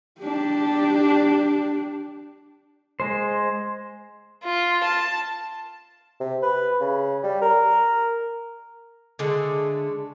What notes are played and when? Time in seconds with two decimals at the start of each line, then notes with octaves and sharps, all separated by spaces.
0.21 D4 G4
3.00 G#3 C5
4.44 F4
4.84 A5
6.20 C3
6.43 B4
6.80 C#3
7.23 G3
7.41 A#4
9.19 D3 G#3 A3